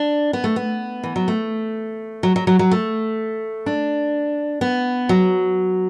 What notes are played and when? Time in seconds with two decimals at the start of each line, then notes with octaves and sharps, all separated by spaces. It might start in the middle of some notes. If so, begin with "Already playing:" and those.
Already playing: D4
0.33 B3
0.44 A3
0.56 B3
1.03 E3
1.16 F#3
1.28 A3
2.23 F#3
2.36 F#3
2.47 F#3
2.59 F#3
2.71 A3
3.66 D4
4.61 B3
5.09 F#3